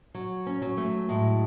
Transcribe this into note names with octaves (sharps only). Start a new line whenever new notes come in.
F#3
C#4
F#3
A3
A2 G#3